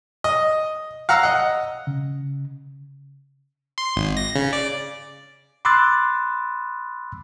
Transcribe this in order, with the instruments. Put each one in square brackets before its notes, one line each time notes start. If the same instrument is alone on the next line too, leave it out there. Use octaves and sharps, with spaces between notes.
[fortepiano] D#5
F5 F#5 A#5 E6
D#5 F#5
[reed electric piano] C#3
[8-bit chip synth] C6
G#1
A#6
C#3
D5
[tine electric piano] B5 C6 D6 E6 F#6 A6